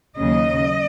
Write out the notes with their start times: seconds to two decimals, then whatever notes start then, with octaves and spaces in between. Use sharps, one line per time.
0.16 D#2 C#3 F#3 D#5